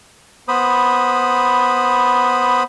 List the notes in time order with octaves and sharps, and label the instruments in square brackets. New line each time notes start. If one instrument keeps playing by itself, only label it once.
[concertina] B3 C5 B5 D#6